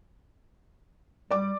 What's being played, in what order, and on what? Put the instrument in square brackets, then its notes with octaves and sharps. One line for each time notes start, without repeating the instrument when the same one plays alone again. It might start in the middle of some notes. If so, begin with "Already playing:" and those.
[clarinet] G3 [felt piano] D5 D6